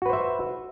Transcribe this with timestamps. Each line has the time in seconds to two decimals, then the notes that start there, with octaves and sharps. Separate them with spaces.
0.02 F#4
0.06 B4
0.09 C5
0.13 E5